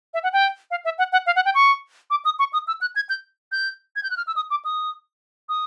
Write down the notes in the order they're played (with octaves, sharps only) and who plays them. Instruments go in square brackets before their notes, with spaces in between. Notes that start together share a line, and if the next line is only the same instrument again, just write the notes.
[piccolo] E5
F#5
G5
F5
E5
F#5
F#5
F5
F#5
G5
C#6
D6
D#6
C#6
D#6
E6
F#6
G#6
G6
G6
G#6
G6
F#6
F6
E6
D#6
D6
D#6
D#6